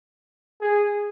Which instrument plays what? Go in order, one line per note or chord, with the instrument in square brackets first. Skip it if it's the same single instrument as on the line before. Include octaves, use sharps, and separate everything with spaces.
[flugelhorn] G#4